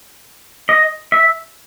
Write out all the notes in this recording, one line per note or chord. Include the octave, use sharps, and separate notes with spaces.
D#5
E5